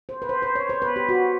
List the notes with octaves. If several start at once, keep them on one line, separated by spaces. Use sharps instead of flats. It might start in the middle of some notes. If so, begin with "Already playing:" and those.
C5
B4
C5
C5
C#5
C5
B4
G4
F#4